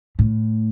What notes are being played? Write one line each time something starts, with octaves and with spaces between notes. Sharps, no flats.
A2